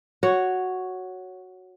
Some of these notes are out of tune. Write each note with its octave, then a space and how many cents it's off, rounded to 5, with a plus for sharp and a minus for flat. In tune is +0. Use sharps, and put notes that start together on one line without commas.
F#4 +0 C#5 +0